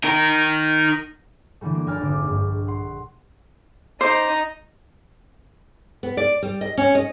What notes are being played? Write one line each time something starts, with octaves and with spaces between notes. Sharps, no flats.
D#4 A#4
D3 E3 G3 A3
A#3
F1 A#4 G5 G#5 F6 A6
G#1 D3 D6
A#1 G2
F#5 C6
D#4 C5 D6
B3
D5
G3
D#5
C#4
D#5